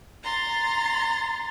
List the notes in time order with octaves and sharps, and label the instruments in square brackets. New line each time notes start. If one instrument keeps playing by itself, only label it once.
[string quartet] A#5 C6 A6